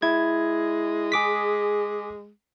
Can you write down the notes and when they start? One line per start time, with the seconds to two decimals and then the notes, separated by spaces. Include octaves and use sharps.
0.02 G#3 E4 G#6
1.12 G#4 D6 B6